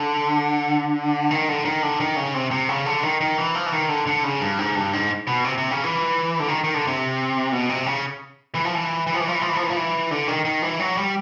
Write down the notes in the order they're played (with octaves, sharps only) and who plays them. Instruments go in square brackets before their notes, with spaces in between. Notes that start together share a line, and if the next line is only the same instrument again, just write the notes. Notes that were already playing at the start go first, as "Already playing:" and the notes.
Already playing: [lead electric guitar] D3
D#3
D3
D#3
D3
D#3
C#3
C3
C3
C#3
D3
D#3
D#3
E3
F3
E3
D#3
D3
D3
C#3
G2
G#2
G2
G#2
B2
C3
C3
C#3
E3
D3
D#3
D#3
D3
C3
B2
C3
C#3
E3
F3
E3
E3
F3
E3
F3
E3
F3
E3
F3
E3
F3
E3
D3
D#3
D#3
E3
F#3
G3